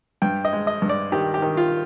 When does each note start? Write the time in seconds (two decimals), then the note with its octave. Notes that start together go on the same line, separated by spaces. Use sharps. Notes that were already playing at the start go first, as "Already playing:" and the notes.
0.22 G2 G5
0.45 D#5
0.53 G#3
0.67 D#5
0.82 G2
0.89 D5
1.12 D#3 G4
1.34 G4
1.42 D#3
1.57 F4